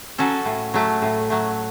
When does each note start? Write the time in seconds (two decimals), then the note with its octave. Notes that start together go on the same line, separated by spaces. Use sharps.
0.18 F#3 C#4 F#4 A4
0.45 A2
0.74 F#3 A3
1.02 A2
1.30 F#3 A3